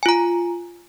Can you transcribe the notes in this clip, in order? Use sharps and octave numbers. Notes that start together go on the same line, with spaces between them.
F4 G#5 A#5